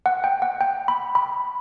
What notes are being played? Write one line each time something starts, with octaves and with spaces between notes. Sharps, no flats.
F#5
G5
F#5
G5
B5
B5